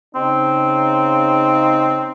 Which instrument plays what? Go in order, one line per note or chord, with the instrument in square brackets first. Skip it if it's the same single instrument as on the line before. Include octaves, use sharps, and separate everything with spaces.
[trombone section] C#3 D#4 [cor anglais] C4